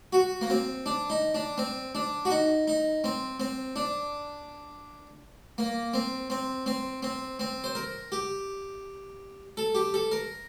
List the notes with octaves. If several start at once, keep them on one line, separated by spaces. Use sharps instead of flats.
F#4
A#3
C4
D4
D#4
D4
C4
D4
F#4
D#4
D#4
C4
C4
D4
A#3
C4
C4
C4
C4
C4
C5
A#4
G4
A4
G4
A4
A#4